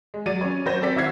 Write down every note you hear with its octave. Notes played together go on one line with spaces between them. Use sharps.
G#3
F#3 D5 A6 D#7
C#4 C#5
F#3 C5 A#6
C4 A4 D5 B6
G#1 E4 F#4 E6 G#6 C7